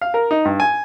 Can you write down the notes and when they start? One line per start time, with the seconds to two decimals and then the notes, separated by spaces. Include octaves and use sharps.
0.01 F5
0.14 A#4
0.31 D#4
0.45 G2
0.60 G#5